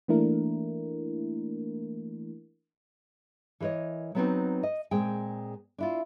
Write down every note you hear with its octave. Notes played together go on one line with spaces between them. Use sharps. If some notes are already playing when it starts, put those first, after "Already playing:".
E3 A3 A#3 D4 E4 A#4
E3 A#4 B4 C#5 D#5
F#3 G3 B3 C4 D#4 F#4
D#5
A#2 G#3 C4 G#4 G5
D4 E4 F4